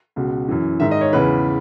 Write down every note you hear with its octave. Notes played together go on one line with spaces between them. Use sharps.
C#2 B2
F#2 E3
G#2 D#3 E5
D#5
C#5
E2 C#3 E3 B4